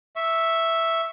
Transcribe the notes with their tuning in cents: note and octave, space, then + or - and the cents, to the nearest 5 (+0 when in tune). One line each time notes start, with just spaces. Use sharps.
E5 +0 C#6 +0